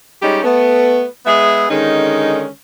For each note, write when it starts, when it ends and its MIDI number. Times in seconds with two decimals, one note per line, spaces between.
0.22 0.40 55
0.22 0.40 56
0.22 0.40 61
0.22 0.40 63
0.22 0.40 67
0.44 1.05 57
0.44 1.05 59
1.26 1.66 56
1.26 1.66 59
1.26 1.66 68
1.26 1.66 76
1.69 2.47 50
1.69 2.47 51
1.69 2.47 56
1.69 2.47 61
1.69 2.47 63